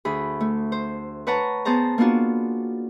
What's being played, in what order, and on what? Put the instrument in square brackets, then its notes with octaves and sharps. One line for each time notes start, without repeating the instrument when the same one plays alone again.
[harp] D2 G#4 B5
A3
C5
B4 C#5 F#5 A5 A#5
B3 G#4 C5 A5 A#5
A#3 B3 D4 F4 F#4